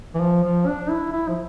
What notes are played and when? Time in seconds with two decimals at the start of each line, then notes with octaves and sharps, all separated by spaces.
0.14 E3
0.20 F3
0.43 F3
0.66 D4
0.90 E4
1.12 E4
1.28 F3